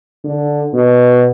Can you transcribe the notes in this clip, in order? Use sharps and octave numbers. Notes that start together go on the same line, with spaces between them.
D3
B2